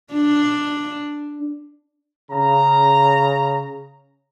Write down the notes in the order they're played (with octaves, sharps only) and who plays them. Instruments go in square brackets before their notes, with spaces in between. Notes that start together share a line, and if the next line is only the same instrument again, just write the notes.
[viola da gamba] D4
[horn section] C#3 A#5